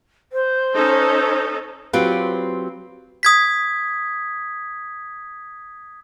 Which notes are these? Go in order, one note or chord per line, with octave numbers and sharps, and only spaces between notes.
C5
C#4 D#4 A4
F#3 C4 F4 G4 B4
D#6 G#6 B6